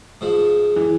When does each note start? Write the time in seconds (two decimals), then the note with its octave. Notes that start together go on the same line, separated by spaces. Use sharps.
0.21 G#2 F3
0.76 E3